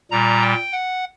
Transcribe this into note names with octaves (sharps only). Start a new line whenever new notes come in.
A#2 G3 A#5
G5
F#5